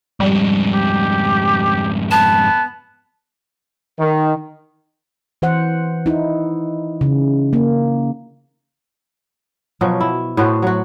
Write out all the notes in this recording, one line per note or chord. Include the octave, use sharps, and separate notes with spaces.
F2 G#2 G3
G4
B3 A5
D#3
E3 C5 F#5
D#4 E4
C#3
A#3
B2 F3 F#3
E4
A2 B3 F#4 C5
F#3 F#4